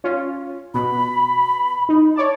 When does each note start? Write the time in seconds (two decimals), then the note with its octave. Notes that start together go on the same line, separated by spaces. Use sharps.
0.04 C#4 F4
0.74 B2 B5
1.89 D#4
2.16 C#5 D5 A5